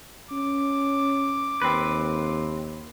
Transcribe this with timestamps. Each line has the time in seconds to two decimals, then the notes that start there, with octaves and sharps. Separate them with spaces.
0.31 C#4 D6
1.62 D#2 C4 B4